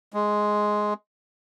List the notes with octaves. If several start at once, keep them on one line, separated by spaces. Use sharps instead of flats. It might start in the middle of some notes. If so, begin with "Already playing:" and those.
G#3